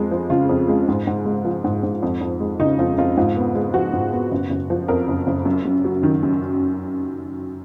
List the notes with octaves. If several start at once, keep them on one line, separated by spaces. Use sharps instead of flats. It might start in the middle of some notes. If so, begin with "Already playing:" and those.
Already playing: F2 G#3
F3
C#3 F4
F2
G#3
G#2
G#2
G#3
F3
G#2
G#2
F2
F2
G#3
C#3 D#4
F2 F4
F2 F4
G#2 F4
B3
G#3
F3 F#4
G#2
B3
F#1
F#1
F3
F2 A#4
F#1
F#1
F#2
F#2
F#3
D#3
F#2